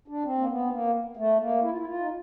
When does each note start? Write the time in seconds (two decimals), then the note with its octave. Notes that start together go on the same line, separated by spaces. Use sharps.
0.08 D4
0.24 C4
0.38 A#3
0.48 B3
0.71 A#3
1.17 A3
1.39 A#3
1.63 E4
1.71 F4
1.78 E4
1.86 F4
2.00 D#4